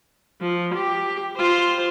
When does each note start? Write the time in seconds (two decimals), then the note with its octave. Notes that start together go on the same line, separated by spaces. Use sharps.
0.41 F3
0.74 G4
1.37 F4 C5